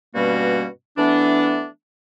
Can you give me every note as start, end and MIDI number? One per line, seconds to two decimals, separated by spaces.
0.15 0.67 43
0.15 0.67 47
0.15 0.67 55
0.15 0.67 58
0.15 0.67 61
0.15 0.67 66
0.98 1.66 52
0.98 1.66 57
0.98 1.66 59
0.98 1.66 62